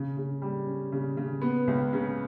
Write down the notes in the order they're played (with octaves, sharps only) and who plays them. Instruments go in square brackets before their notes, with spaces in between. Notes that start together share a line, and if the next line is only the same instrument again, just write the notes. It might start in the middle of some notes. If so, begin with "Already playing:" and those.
Already playing: [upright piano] C#3
C#3
G3
C#4
C#3
C#3
B3
C#2
C#3